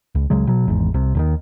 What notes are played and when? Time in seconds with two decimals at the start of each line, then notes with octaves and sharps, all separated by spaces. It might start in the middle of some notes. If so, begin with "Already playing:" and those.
0.15 C#2
0.30 C#2 C#3 F#3 G#3
0.47 B2 F#3
0.68 G#1 E2 G#2
0.94 C2 C3
1.15 D#2 D3 D#3